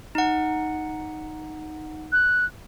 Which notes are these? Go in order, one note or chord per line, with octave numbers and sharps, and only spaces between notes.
D#4 F#5
F#6